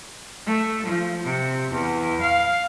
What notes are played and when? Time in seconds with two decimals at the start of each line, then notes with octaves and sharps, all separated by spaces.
0.46 A3
0.87 F3
1.24 C3
1.72 E2
2.22 F5